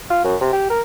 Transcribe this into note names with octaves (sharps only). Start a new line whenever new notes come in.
F4
F#2
C3
G4
A#4